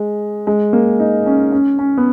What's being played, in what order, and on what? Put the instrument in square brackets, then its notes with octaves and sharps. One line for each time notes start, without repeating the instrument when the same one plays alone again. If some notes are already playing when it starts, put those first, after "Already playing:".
Already playing: [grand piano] G#3
G#3
A#3
D#4
C#4
C#4
C#4
B3